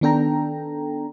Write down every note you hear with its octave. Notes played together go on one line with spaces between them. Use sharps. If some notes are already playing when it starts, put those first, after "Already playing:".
D#3 B3 D4 A4 G5 A#5